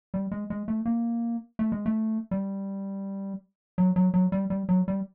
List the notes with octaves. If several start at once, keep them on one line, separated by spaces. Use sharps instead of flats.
G3
G#3
G#3
A3
A#3
A3
G#3
A3
G3
F#3
F#3
F#3
G3
G3
F#3
G3